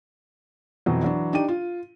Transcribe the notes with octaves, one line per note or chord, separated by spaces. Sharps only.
F2 B2 E3 F#3
E3 F#3 D4
D4 D#4 G4 G5 D#7
F4